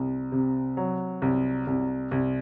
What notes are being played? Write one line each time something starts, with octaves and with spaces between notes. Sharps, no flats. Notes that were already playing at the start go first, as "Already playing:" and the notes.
Already playing: C2
C3
F#3
C2
C2
C2